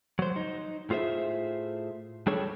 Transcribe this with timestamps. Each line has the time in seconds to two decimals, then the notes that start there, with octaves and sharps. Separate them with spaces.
0.19 F#3 C5
0.36 D#4
0.90 A2 F4 G#4 C5 E5
2.27 G3 D4 G#4 A4 C#5